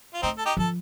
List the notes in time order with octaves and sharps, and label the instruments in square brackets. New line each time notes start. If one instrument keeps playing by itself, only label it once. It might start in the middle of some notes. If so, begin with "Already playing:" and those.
[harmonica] F4
[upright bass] A3 [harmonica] C4 D#4
[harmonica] A4
D#4 G4
[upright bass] F3 [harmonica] A4